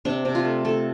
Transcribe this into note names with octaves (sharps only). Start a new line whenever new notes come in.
C3 D4
C3
F4
A3
A3 A4